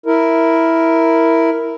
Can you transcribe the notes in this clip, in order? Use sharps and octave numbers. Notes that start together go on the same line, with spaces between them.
E4 A#4